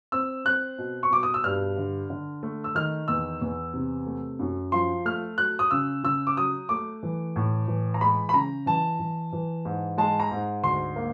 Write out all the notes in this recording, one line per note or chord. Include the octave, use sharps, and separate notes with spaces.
C4 E6
C4 F#6
B2
C#6
B2 D6
D#6
E6
G2 F6
D3
D3
A3
E6
D#3 F6
E2 E6
E2
C3
A3
F#2
F3 C6
A3 F6
F#3 F#6
D#6
C#3 E6
C#3 E6
D6
F#3 D#6
A3 D6
E3
A2
E3
A#5
G#3 B5
B5
C#3 A#5
E3 A5
E3
E3
G#2
G#3 A5
A#5
G#2
D2 C6
A#3